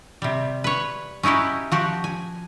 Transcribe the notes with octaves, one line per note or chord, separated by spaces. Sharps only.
C3 G3
B4 C#5
C#4 D#4 E4 F#4 G4
F3 F#4 G4
G#5